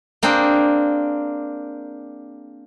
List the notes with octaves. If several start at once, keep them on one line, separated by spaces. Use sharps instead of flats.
A#3 C4 D4 G#4 G5